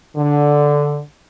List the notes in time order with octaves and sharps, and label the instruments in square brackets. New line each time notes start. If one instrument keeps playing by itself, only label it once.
[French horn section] D3